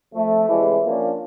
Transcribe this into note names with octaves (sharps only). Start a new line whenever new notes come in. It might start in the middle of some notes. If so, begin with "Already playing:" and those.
F2 F3 A3
A2 C3 E3 G3 G#3
F3 A#3 C#4 D4 F4